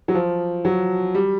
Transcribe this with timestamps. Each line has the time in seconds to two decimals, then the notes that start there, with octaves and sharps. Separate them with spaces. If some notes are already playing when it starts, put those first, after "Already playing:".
0.08 F#3
0.15 F3
0.65 F#3
1.15 G3